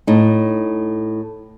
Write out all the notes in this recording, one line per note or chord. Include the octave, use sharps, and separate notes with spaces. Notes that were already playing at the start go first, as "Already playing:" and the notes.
A2 D#4